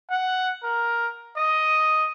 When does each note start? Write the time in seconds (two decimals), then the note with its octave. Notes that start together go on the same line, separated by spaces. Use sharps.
0.10 F#5
0.64 A#4
1.37 D#5